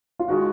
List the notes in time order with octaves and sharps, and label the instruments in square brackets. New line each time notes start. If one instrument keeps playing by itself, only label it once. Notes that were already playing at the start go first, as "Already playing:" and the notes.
[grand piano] F4
[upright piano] D#3 G#3 [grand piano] F#4